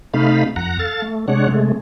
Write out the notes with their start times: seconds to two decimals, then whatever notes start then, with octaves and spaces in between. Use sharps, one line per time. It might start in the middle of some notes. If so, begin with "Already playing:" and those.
0.14 C3 A3 D#4 F5 B5
0.56 F2 F#5 A#5
0.79 A4 F5 A6
1.02 A3
1.28 C3 G#3 D4 C#5 F#5
1.49 C3 G#3 A3